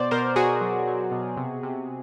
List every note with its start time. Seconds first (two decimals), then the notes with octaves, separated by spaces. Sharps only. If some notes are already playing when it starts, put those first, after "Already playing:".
Already playing: B2 C5 D5
0.11 B2 A#4 C5
0.36 B2 F#4 G#4
0.61 F#3
0.87 F#3
1.12 B2
1.37 C3
1.63 C3